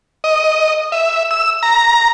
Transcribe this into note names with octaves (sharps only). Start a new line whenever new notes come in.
D#5
E5
E6
A#5